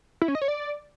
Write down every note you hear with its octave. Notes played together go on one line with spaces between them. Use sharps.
E4
C#4
D#5
C#5
D5